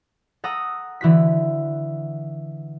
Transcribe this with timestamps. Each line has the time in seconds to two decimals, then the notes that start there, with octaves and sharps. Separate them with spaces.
0.44 A4 F#5 A#5 D#6
1.01 D3 E3 F#4 B6